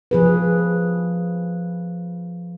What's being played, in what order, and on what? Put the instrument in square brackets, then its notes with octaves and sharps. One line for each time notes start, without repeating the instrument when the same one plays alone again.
[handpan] F3 G#4 B4